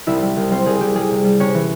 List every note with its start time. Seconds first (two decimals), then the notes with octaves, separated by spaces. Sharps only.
0.07 C2 E4 E5
0.22 G3
0.37 C2
0.51 G3 C4 C5
0.66 C2 G#4
0.81 C2 G4
0.96 G3 G#4
1.11 C3
1.25 G3
1.40 C3 C#4 C#5
1.54 E3